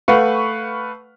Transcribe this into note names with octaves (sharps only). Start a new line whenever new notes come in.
A3 B4 F5 F#5 C#6